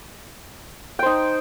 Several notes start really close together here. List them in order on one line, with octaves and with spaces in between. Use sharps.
G5 C5 D#4